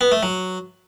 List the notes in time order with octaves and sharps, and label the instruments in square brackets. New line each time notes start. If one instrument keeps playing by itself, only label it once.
[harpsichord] B3
A3
F#3